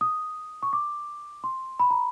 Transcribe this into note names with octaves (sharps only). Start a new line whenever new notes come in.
D#6
C#6
D6
C6
B5
A#5